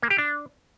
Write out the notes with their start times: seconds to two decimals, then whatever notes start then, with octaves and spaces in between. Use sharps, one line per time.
0.02 A#3
0.10 G4
0.18 D4